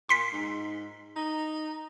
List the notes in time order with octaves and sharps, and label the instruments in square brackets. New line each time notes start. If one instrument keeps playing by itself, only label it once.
[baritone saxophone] A#2 [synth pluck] C6 B6 C7
[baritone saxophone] G#2
D#4